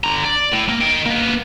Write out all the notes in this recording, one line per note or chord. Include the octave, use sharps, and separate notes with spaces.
D3 A#5
D5
A2
A#3
D#5 G5
A#3 B3